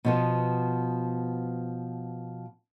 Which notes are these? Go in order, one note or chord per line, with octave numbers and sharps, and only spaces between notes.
B2 F3 B3